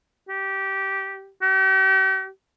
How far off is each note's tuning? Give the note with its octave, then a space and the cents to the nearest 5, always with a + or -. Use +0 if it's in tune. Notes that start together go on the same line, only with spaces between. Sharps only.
G4 -15
G4 -45